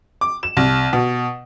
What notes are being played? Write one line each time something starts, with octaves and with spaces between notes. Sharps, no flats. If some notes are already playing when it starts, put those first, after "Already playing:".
D6
E7
C2
B2